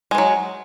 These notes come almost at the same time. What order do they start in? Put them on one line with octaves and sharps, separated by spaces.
G#3 E3 F#3